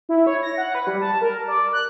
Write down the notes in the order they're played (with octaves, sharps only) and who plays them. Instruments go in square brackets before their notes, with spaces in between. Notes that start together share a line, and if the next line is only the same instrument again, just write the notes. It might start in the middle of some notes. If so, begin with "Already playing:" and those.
[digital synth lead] E4
C#5
A#6
F#5
B4
G3
A5
A#4
D5
F#6